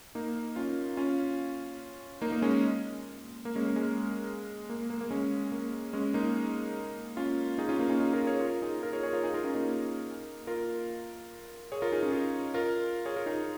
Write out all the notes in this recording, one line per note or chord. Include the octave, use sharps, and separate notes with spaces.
A#3 D#4
C#4 F4
C#4 F4
A#3 D#4
A#3 D#4
G#3 C#4
A#3
G#3 C#4
A#3
G#3
A#3
A#3
A#3
G#3 C#4
A#3
G#3 C#4
A#3 D#4
C#4 F4
D#4 G#4
C#4 F4
A#3 D#4
C#4 F4
D#4 G#4
F4 A#4
G#4 C#5
F4 A#4
D#4 G#4
F4 A#4
G#4 C#5
G#4 C#5
F4 A#4
D#4 G#4
F4 A#4
C#4 F4
A#3 D#4
F4 A#4
G#4 C#5
F4 A#4
D#4 G#4
C#4 F4
D#4 G#4
F4 A#4
G#4 C#5
F4 A#4
D#4 G#4